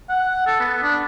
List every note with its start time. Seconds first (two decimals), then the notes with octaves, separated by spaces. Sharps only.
0.09 F#5
0.47 A4
0.60 B3
0.83 D4